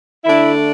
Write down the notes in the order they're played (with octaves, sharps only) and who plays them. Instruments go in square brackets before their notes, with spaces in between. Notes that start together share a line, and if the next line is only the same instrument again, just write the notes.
[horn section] D3 A3 D4 E4